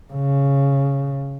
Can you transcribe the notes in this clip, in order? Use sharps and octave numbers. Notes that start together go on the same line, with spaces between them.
C#3